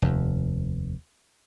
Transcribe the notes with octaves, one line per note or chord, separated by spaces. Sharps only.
F1 D#2